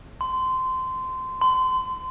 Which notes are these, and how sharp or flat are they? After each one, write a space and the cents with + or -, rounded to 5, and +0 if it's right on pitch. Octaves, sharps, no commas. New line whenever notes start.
C6 -20
C6 -30